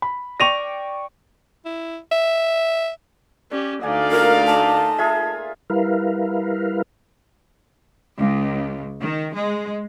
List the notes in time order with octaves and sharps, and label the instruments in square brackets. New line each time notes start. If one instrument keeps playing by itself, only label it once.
[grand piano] B5
[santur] D5 G5 C#6 [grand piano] A#6 D#7 F7
[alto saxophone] E4
E5
[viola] C#4 G4 [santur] D5
[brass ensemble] D2 D5 F5 [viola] A3 D#4 [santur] G#5
[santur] A#3 F4 [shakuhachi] A#4
[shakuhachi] A5
[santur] F4 G#4 E5
[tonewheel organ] G3 E4 A#4 B4 F5
[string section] C#2
D#3
G#3